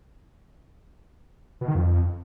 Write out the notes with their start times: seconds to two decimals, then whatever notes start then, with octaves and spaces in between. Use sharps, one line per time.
1.61 B2
1.68 D#3
1.75 F2